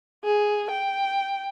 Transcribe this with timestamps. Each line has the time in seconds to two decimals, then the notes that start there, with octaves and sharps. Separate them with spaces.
0.24 G#4
0.70 G5